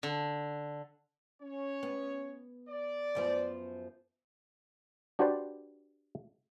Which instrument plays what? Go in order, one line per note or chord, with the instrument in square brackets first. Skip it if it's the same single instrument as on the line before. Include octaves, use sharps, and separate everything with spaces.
[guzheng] D3
[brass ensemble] C#4 C#5
[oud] B3
[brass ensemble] D5
[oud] F#2 F3 B3
[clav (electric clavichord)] D4 F#4 G4 B4 C5 D5